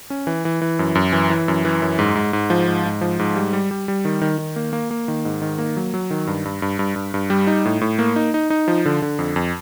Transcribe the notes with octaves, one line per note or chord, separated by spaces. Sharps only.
C#4
E3
E3
E3
F#2
F#2
E3
E3
F#2
E3
F#2
G#2
G#2
G#2
F3
G#2
G#2
F3
G#2
G3
G3
G3
G3
D#3
D#3
D#3
A#3
A#3
A#3
D#3
G#2
D#3
A#3
F#3
F#3
D#3
G2
G2
G2
G2
G2
G2
G3
D#4
A2
A2
A#3
D#4
D#4
D#4
F3
D3
D3
F2
F2